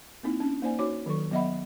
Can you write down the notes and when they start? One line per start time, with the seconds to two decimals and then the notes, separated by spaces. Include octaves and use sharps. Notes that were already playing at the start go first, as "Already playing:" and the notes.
0.23 A#3 C4 D#4 E4
0.40 C#4 D4
0.62 A#3 D#4 C5 D5 G#5
0.79 D#4 F#4 C#5 D6
1.06 D#3 F#3 A4 C#6
1.31 F#3 B3 D#5 E5 F#5 B5